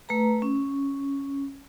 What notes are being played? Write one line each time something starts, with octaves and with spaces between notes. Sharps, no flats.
A3 B4 A#5
C#4